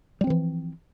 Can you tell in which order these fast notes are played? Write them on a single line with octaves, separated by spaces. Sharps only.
G3 C4 F3 E3